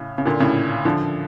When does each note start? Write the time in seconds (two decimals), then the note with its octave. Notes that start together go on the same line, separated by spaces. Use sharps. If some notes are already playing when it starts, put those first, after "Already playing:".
Already playing: A2 C#3
0.18 C#3
0.25 A#2 D3
0.40 A2 C#3
0.85 D3 F3